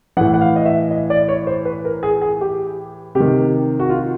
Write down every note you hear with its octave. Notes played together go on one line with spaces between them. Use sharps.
A2 E3 F#5
F#5
F5
D#5
E5
D#5
D5
C#5
C5
B4
A#4
G#4
G#4
G4
C3 G4
D#3
F#4
F4